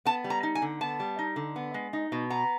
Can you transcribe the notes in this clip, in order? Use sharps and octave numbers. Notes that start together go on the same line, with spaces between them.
B3 A5
G3
A#5
D#4
G#5
D3
B3 A5
G3
D#4
D3
B3
G#3
D#4
B2
B3 A#5